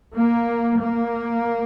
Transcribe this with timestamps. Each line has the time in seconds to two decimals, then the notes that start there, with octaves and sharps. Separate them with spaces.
0.15 A#3
0.80 A#3